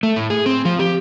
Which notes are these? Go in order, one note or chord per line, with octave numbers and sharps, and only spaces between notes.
A3
A2
G#4
C4
F3
G4